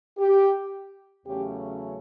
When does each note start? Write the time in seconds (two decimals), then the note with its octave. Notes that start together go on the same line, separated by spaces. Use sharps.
0.18 G4
1.26 E2 C#3 F#3 A3 C#4 G4